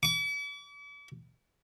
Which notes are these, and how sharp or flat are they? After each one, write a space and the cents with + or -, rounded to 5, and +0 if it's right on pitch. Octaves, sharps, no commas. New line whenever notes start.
D6 -45